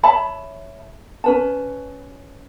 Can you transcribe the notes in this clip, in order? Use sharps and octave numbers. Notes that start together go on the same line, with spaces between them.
C#5 E5 A5 B5
C#4 B4 A5